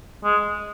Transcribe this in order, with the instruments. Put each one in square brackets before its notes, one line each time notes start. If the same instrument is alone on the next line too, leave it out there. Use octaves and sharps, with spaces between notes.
[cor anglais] G#3